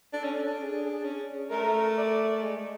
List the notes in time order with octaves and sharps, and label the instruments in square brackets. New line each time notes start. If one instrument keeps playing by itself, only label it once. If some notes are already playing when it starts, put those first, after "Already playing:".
[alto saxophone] D4 [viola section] A4
[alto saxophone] C#4
D4
D4
[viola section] G#4
[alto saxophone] C#4
[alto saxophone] A3 [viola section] A#4
[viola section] D5
[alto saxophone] G#3